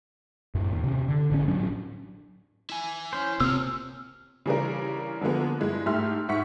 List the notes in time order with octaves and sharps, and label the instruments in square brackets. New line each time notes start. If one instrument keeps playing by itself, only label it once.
[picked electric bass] F#2 A2
D#2
C3 C#4
D3
A1 D3 C#4
A2 F#3 C#4 D4
[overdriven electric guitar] E4 G#5
[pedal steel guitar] C#4 C5
[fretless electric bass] C3 A#3 C4 [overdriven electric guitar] F4 C#5 [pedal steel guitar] E6 F6
[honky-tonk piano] C#3 E3 G3 D4 F4 A#4
D3 F3 G#3 A#3 B3
G2 G#3 E4
G#2 A3 G4 E5 C6 F6
G#2 E5 F#5 C#6 B6